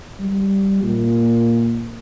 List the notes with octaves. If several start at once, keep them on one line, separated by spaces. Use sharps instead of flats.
G3
A#2